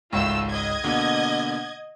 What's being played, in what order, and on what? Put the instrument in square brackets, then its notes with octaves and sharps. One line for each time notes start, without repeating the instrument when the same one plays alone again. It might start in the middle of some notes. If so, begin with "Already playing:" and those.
[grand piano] G#1 C#2 C#6 [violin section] A3 F4 E6
[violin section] D#5 G#6
[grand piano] B2 D3 A#3